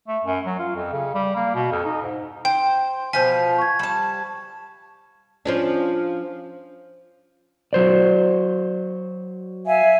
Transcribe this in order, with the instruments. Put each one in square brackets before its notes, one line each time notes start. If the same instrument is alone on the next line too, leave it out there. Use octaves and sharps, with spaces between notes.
[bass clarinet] A3
F#2
F#3
F4
F2
C#3
G3
A#3
B2
F2
D#4
G#2
[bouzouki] C5 [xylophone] G5
[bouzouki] B2 F3 F4 [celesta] C5 G6 B6 [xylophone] G#5
[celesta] C#6 G#6
[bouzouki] G3 A5
[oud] F3 C#4 D4
[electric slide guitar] F#3 C5 D5
[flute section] E5 F5 G#5